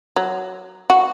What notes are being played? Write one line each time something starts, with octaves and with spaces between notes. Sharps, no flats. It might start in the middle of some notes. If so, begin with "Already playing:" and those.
F#3
F#4